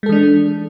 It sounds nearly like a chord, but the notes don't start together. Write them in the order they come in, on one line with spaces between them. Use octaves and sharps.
G#3 A4 E3 D4